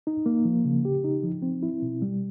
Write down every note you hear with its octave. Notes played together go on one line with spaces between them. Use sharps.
D#4
A#3
F3
C#3
G4
D#4
F3
C4
E4
B2
G3